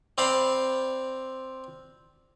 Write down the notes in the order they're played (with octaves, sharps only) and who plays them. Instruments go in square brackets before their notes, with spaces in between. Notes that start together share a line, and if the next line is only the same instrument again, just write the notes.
[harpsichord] C4 D5 F5 B5